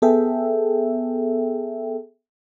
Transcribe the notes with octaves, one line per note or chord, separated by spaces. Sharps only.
B3 G#4 A4 E5 G5